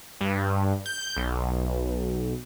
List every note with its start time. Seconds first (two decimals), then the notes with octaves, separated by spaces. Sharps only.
0.21 G2
0.86 G6
1.16 B1